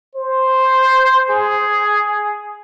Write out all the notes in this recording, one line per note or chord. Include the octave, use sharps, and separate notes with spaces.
C5
G#4